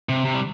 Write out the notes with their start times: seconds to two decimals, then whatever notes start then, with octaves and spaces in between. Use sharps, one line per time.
0.09 C3
0.25 C3
0.34 G3